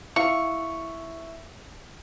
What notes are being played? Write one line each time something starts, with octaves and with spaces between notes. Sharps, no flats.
E4 F5 C#6